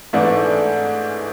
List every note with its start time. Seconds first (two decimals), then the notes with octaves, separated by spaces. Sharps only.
0.13 G#2 E3 A3 D4